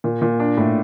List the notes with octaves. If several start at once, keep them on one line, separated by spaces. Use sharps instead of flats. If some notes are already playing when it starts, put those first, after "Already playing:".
A#2
A#2
D4
A2